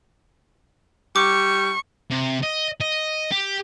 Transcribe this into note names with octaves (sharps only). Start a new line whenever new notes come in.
G3 C#6 D6
C3
D#5
D#5
G4